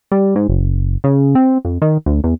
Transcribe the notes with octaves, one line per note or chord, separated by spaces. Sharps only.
G3
G#2
F#1
C#3
C4
F2
D#3
D2
E2